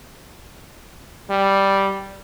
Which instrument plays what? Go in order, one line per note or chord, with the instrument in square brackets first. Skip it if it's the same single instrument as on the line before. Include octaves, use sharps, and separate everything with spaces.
[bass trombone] G3